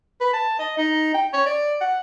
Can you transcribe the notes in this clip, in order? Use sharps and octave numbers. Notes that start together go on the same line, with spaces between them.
B4
A5
D#5
D#4
G5
C#5
D5
F#5